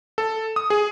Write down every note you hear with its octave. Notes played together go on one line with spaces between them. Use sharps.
A4
D#6
G#4